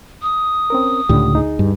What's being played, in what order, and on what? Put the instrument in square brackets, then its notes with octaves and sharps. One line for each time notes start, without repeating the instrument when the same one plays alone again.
[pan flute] D#6
[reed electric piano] C4 C#4 A#4
[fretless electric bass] C#2 A2 D3 [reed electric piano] G4
[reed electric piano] D2 D#4 G#4
[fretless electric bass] G2